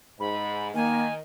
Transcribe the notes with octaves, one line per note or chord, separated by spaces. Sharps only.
G#2 B5
D#3 A#3 G#5